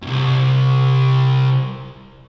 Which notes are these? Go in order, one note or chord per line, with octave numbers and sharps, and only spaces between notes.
C2 F#2